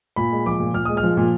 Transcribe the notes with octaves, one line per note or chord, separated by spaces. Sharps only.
A#2 B5
G#3
F3 D6
A#2
A#2 F6
G#3 D#6
F6
F3
A#2